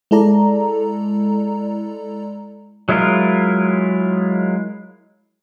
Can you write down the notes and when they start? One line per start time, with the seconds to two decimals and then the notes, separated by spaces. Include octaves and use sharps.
0.11 G#3 E4 A4 D5 A#5
2.89 F#3 G#3 E4 F4 A#4